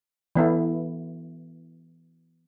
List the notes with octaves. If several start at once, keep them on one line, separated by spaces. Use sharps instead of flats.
E3 B3 E4 A4